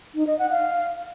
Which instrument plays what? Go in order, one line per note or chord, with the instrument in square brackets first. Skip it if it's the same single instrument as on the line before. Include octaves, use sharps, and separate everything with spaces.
[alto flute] D#4
D#5
F#5
F5